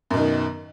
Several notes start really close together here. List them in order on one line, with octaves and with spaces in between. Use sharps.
F#2 B2 D#3